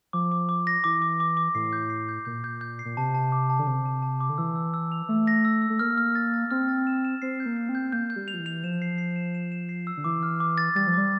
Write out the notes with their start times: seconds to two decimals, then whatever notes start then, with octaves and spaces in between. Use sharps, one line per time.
0.13 F3 D6
0.32 D6
0.49 D6
0.67 A#6
0.84 E3 D6
1.02 D6
1.20 D6
1.37 D6
1.55 A2 C7
1.73 G6
1.90 C7
2.09 G6
2.25 A#2 G6
2.44 G6
2.61 G6
2.79 C7
2.85 A#2
2.97 C3 A5
3.15 A5
3.32 D6
3.50 A5
3.59 D3
3.67 C3 A5
3.85 A5
4.02 A5
4.20 D6
4.29 D3
4.38 E3 E6
4.55 E6
4.74 E6
4.92 F7
5.09 A3 E6
5.27 A#6
5.45 E6
5.62 E6
5.70 A3
5.79 A#3 F6
5.98 F6
6.15 A6
6.34 A6
6.51 C4 F6
6.69 A6
6.87 E7
7.05 E7
7.22 C4 C7
7.40 G6
7.46 A#3
7.57 C7
7.69 C4
7.75 G6
7.92 A#3 G6
8.10 G6
8.16 G3
8.28 F7
8.34 F3
8.39 E3
8.46 F7
8.64 F3 E7
8.82 C7
8.98 C7
9.16 E7
9.35 E7
9.52 E7
9.69 C7
9.87 E6
9.97 D3
10.04 E3 D6
10.23 F6
10.40 D6
10.58 A6
10.75 G3 A6
10.87 F3
10.94 G3 D6